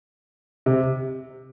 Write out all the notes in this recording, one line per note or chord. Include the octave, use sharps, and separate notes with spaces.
C3